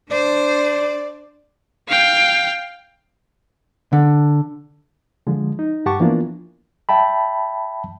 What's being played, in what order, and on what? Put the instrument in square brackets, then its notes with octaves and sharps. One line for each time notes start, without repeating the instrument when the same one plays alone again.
[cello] D4 C5 [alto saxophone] D5
[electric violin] F5 G5
[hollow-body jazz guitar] D3
[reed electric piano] D3 F3 G#3
D#4
G2 G4 F#5 A5 C#6 D6
E3 F3 A#3 B3 D4 F4
E5 G5 A5 B5